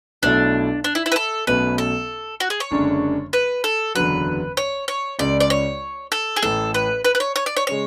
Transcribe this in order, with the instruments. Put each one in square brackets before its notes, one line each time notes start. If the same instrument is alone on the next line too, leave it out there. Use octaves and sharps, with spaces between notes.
[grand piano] B1 B2 A3 E4 A4 [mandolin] D4
[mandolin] D4
E4
E4
B4
A4
[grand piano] B1 B2 A3 C#4 [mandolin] B4
[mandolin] A4
F#4
G#4
C#5
[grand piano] F#1 F#2 D3 G#3 D4
[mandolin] B4
A4
[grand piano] F#1 E2 D3 F#3 [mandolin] B4
[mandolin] C#5
C#5
[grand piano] C#2 C#3 G#3 C#4 [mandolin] D5
[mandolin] D5
C#5
A4
G#4
[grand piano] A1 A2 E3 A3 [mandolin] A4
[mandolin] B4
B4
B4
C#5
C#5
D5
C#5
[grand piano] C#3 G#3 [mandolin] C#5